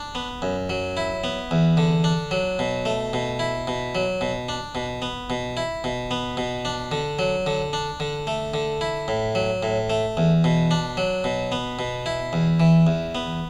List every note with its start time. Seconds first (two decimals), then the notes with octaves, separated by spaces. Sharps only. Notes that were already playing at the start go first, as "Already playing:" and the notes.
Already playing: D4
0.15 B3
0.42 F#2
0.70 F#3
0.97 E4
1.24 B3
1.51 E2
1.77 D3
2.04 D4
2.31 F#3
2.59 B2
2.85 A3
3.13 B2
3.39 E4
3.67 B2
3.95 F#3
4.21 B2
4.49 D4
4.75 B2
5.02 B3
5.30 B2
5.57 E4
5.84 B2
6.11 B3
6.37 B2
6.65 D4
6.92 D3
7.19 F#3
7.46 D3
7.73 D4
8.00 D3
8.27 A3
8.54 D3
8.81 E4
9.08 A2
9.35 F#3
9.63 A2
9.90 A3
10.17 E2
10.44 B2
10.71 D4
10.97 F#3
11.24 B2
11.52 B3
11.79 B2
12.06 E4
12.33 E2
12.60 E3
12.87 E2
13.15 B3